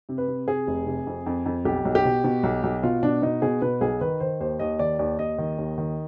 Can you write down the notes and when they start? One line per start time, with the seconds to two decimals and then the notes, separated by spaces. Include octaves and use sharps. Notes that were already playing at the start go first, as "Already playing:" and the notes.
0.09 C3
0.18 B4
0.28 C3
0.48 C3 G#4
0.67 F1
0.86 C3
1.07 F2
1.26 F2
1.46 F2
1.65 B1 G4
1.85 B1
1.95 G4
2.05 B2
2.24 B2
2.43 B1
2.63 B1
2.83 B2 F4
3.03 B2 D4
3.22 B2 D#4
3.42 B2 G#4
3.62 B2 B4
3.81 B1 G#4
4.01 D#3 B4
4.20 D#3 C5
4.40 D#2 C5
4.59 D#2 D#5
4.79 D#3 D5
4.99 D#2 D5
5.19 D#2 D#5
5.38 D#3
5.58 D#2
5.78 D#3